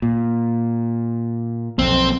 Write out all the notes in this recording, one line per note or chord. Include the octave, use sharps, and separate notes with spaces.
A#2
B1 F2 C4